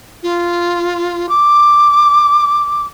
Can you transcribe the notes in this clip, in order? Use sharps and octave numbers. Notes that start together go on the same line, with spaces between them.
F4
D6